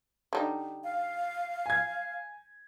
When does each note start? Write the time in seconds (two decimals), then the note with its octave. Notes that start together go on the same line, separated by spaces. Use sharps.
0.33 D3 G3 D#4
0.84 F5
1.66 G#5 G#6